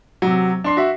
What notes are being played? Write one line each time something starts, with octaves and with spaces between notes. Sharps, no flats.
C3 F#3
D4 C6 C7
F#4 E5